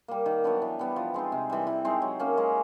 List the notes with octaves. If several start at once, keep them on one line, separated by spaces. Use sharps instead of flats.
G3 A#3
D#3
F#3 B3 D4
E3
G3 B3
F3
G#3 C4 D#4
C3
E3 G3
E3
G#3 C4 D#4
F#3
A#3 C#4
G#3